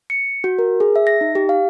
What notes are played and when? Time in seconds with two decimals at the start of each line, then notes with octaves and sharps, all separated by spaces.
0.10 C#7
0.44 F#4
0.59 A#4
0.80 G#4
0.96 E5
1.07 A#6
1.21 D#4
1.35 G4
1.49 F5